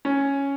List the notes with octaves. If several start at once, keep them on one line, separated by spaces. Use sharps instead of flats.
C#4